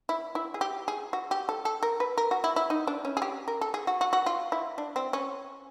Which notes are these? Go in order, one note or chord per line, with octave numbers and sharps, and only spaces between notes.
E4
E4
G#4
G4
G#4
F#4
G4
A4
A4
A#4
B4
A#4
F#4
E4
E4
D#4
D4
C#4
G#4
G4
A#4
A4
G#4
F#4
F#4
F#4
F4
E4
D4
C4
C#4